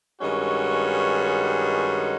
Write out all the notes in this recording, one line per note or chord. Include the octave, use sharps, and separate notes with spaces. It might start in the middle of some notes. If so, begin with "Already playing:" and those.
G2 D#3 G#3 C#4 F#4